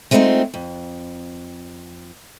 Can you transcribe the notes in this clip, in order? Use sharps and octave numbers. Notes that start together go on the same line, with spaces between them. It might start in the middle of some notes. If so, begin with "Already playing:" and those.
G#3 A3 C4 D4 D#4 F4
F2